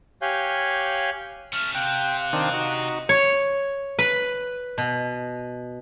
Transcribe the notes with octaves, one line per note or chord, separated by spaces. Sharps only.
G4 C#5 F5 G#5 F#6 G6
A3 C#4 F6
C3 F5 G5 F#6
D#3 C4 D4
D#4 F#4
C#5
B4
B2